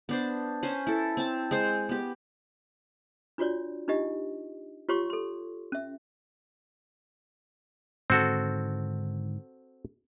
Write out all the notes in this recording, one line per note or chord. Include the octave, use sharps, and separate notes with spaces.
B3 D4 C5
C#4 B4 C5
E4 A4
C4 A5
G#3 C5
B3 G4
D4 F4 F#4 C#5 D5
D4 D#4 F4 G4 D#5
F4 G4 C#5 C6 C#6
A4 C6
C#4 E5
G#2 D3 D#3 C4 F#4 A4